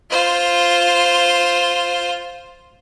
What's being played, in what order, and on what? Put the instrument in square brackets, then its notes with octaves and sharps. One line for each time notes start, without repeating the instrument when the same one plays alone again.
[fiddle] F4 C5